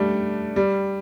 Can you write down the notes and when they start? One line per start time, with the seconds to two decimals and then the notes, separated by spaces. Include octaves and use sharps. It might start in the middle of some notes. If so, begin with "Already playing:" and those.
Already playing: G3 A3 D4
0.56 G3